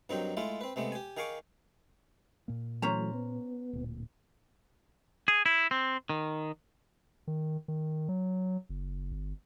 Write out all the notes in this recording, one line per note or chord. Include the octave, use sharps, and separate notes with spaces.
G2 D#3 F#3 C4 D#4
G#3 A3 E4 F4
C4 B4
C3 G#3 A3 B3
G4 G#5
D#3 G#4 F5 G#5 C#6 D6
A#2 A#3
E3 F#3 A3 C#4 C5 A#5
B3
D1 A#2
G#4
E4
C4
D#3
D#3
D#3
F#3
F#1
G1